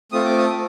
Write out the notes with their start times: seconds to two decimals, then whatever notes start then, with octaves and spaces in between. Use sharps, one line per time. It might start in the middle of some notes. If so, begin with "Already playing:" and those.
0.12 A3 C4 F4 A4 D#6
0.25 D6
0.38 D#6